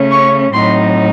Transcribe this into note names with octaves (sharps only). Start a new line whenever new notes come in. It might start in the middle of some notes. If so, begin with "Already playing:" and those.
Already playing: C#3 A3 C#4
C#6
A2 F#3 C4 D#4 C6